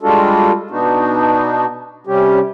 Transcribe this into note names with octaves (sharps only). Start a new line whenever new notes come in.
G3 G#3 D4 F4 F#4 A4
B2 B3 D4 D#4 F#4
C3 G3 C#4 G4